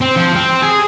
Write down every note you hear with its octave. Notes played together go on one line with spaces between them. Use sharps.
C4
F3
C4
G#4